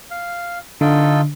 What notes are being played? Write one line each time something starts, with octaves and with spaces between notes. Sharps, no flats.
F5
D3 D#4 F4 A4